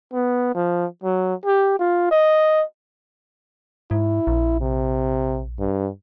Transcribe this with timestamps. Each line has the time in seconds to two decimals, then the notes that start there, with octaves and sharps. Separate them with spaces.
0.13 B3
0.55 F3
1.03 F#3
1.45 G4
1.79 F4
2.12 D#5
3.91 G#2 E4
4.27 A#1
4.61 C3
5.59 G2